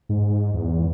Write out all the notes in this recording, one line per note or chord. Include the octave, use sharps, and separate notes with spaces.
G#2
E2